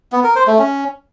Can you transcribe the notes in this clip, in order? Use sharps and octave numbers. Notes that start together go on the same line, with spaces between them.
B3
A#4
C5
A3
C#4